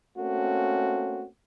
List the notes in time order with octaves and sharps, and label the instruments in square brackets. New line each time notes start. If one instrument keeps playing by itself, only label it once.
[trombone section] A3 A#3 C4 C#4 F#4